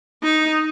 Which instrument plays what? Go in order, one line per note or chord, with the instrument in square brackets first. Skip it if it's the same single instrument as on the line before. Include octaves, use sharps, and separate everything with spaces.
[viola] D#4